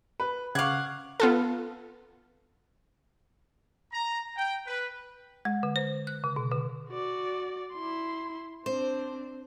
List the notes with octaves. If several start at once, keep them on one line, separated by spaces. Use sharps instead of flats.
B4
C#3 F5 F#5 C#6 D6 F#6 G#6
B3 F4 A4
A#5
G5
B4
G#3
D3
C5
F#6
C#3
B2
D3
F#4 D5
E4 C6
C4 D4 C5